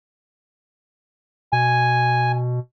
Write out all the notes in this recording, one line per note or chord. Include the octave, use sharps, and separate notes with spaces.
B2 G#5